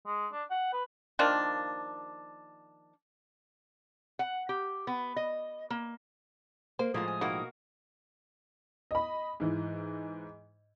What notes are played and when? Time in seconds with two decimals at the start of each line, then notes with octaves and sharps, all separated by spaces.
0.06 G#3
0.32 D4
0.50 F#5
0.73 B4
1.19 D#3 F3 A#3 D4
4.19 F#5
4.49 G4
4.87 B3
5.16 D#5
5.70 A#3
6.79 A#3 C5
6.94 A2 F3 G#3 A#3 B3 F4 D#6
7.08 G#5
7.21 B2 D#3 A#3 E4 F#4
8.91 D#5 B5
9.40 G#2 E3